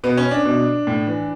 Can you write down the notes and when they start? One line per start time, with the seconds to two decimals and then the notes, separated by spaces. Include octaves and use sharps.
0.04 B2 B3
0.17 C#4
0.31 D4
0.45 B2
0.87 A2
1.07 E3